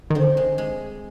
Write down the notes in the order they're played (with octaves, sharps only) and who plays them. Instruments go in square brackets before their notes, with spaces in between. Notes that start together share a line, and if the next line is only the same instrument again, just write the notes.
[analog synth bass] D#3
[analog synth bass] D3 [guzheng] C4
[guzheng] G#3
G#3